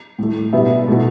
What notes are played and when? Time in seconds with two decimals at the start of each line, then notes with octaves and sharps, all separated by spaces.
0.19 A2 A3
0.53 B2 G3 B3 E5
0.88 B2 A3